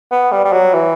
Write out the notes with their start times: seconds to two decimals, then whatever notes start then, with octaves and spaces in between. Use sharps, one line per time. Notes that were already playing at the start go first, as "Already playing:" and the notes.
0.11 B3
0.31 G3
0.44 G3
0.52 F#3
0.74 E3